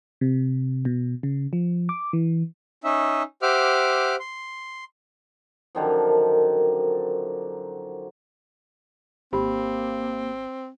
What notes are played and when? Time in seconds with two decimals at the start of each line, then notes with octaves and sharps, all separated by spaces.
0.21 C3
0.85 B2
1.23 C#3
1.53 F3
1.89 D6
2.13 E3
2.84 C#4 D#4 E5
3.42 G4 C5 E5 F#5 D6 F6
4.20 C6
5.75 F#2 D3 D#3 F3
9.33 G#1 A#3 C4 G4 B5